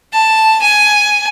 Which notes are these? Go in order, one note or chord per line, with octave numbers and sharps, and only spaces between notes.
A5
G#5